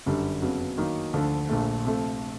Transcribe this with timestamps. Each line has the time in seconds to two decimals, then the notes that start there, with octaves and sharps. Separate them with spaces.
0.06 G1 F#2 D3 G3
0.42 F2 C#3 F#3 B3
0.78 D#3 F#3 A#3 D#4
1.13 D2 D3 F3
1.49 A#1 A#2 F3 A3
1.85 C3 F3 A3